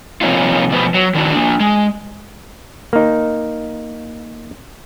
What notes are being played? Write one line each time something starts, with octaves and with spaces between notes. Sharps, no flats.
C3 F3 A#3 C#4 D#4 F4
B2 F3 B3 B4 C5
F#3
D#3 D4 E4 F#4
A#3 D4
G#3
A#3 D#4